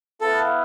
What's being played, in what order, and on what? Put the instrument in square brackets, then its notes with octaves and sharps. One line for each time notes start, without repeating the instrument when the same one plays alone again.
[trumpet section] B3 E4 B4 F5 [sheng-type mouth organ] A4